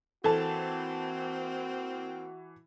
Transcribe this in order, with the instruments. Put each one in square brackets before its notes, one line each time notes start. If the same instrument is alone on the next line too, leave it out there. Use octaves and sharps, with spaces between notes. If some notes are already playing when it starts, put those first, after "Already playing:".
[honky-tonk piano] E3 A5 [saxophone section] A#3 C4 [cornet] F#4 [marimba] A4